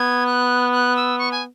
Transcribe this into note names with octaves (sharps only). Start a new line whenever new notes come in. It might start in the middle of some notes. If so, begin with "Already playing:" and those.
Already playing: B3 G#6
F#6
F#6
E6
C#6
G#5